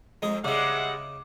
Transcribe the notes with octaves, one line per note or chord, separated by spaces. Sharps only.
F2 G#3 D#4 G#4
C#3 G3 G#3 D#4 E5 F#5 D6